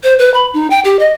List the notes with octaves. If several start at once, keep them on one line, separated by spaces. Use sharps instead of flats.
C5
B4
B5
D#4
G5
G4
D#5